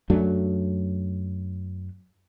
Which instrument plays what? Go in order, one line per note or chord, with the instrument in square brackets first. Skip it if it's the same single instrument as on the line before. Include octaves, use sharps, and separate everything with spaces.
[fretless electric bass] F#2 F#3 A3 D4